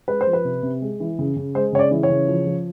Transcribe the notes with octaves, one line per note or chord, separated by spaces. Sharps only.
G#3 B4
C5
F3
B4
C3
C3
G#3
E3
C#3
C#3
G#3 C5
C#3 C#5
D5
E3
C#5
C#3
F3
F3